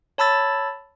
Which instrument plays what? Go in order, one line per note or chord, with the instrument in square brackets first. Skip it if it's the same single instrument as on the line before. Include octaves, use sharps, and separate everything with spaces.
[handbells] C#5 A5 B5 E6 A6